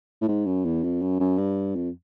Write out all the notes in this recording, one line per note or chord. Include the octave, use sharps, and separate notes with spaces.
A2
G#2
F#2
E2
F2
F#2
F#2
G2
F2